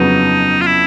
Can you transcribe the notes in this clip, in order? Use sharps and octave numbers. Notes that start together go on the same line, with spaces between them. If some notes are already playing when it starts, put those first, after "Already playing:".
Already playing: F2 C#3 F#3 B3 D#4
F4
E4